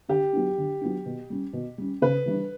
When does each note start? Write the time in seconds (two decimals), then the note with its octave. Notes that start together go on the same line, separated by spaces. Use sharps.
0.09 D3 G4
0.33 F#3 B3 D4
0.58 D3
0.81 F#3 B3 D4
1.06 B2
1.30 G3 C#4
1.53 B2
1.78 G3 C#4
2.02 C#3 B4
2.26 E3 G3 D4